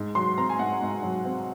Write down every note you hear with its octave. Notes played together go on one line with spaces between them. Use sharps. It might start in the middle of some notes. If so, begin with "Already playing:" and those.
Already playing: G#2
F#3 C6
C4 A#5
G#5
G#2 F#5
G#2
F#3
C4